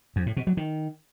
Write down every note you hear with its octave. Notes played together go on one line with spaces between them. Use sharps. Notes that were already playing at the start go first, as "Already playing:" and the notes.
F2
A2
B2
F#3
D#3